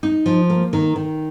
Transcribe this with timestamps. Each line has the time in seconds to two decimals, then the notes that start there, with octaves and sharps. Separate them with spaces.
0.03 D#4
0.26 F3
0.50 A#3
0.73 D#3
0.96 D#3